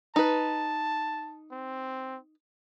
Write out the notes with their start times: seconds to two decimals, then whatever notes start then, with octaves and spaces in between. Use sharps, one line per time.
0.16 D#4 B4 A5
1.51 C4